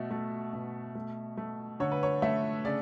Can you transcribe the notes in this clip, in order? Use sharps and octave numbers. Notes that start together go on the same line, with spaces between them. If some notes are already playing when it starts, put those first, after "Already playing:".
Already playing: B2 A3 F#4 E5
A3
B2
A3
A3
D3 C#5
B4
C#5
A3 E5
C#3 D5